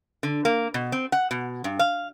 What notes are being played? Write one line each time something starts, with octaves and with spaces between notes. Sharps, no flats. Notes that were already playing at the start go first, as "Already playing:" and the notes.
D3
A#3
B2
C4
F#5
B2
G2
F5